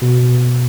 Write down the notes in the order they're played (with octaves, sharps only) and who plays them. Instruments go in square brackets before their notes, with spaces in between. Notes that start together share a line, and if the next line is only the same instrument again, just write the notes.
[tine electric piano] B2